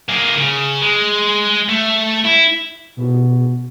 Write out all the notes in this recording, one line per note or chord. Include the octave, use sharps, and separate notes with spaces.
A#3 G#4
C#3
G#3
A3
E4
B2